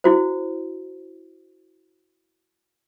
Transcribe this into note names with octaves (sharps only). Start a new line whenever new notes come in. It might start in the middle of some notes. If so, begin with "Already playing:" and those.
E4 F#4 C5